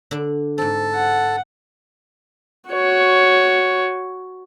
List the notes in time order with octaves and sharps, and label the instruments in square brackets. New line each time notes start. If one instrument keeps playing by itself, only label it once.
[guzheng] D3 D4
[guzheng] G#2 C4 [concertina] A4
[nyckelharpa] F#5
F#4 C#5